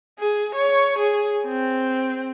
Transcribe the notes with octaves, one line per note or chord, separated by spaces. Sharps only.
G#4
C#5
G#4
C4